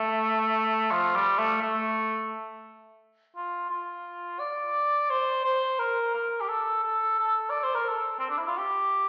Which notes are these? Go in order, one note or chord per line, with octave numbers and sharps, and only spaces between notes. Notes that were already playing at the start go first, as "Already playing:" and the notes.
Already playing: A3
F3
G3
A3
A3
F4
F4
D5
C5
C5
A#4
A#4
G4
A4
A4
A4
D5
C5
A#4
A4
C4
D4
E4
F4
G4